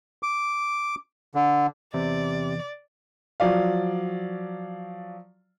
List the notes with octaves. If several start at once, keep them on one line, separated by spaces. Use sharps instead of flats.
D6
D3
E2 C3 D5
F3 F#3 D5 F5